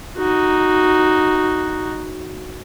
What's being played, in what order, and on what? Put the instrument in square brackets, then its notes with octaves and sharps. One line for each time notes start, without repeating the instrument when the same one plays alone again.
[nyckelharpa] D#4 F#4